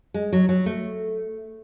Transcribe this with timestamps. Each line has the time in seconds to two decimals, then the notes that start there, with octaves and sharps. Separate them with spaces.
0.14 G#3
0.32 F#3
0.49 F#3
0.66 A3